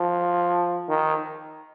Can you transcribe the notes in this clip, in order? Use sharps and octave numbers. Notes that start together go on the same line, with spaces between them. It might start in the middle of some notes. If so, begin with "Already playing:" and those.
Already playing: F3
D#3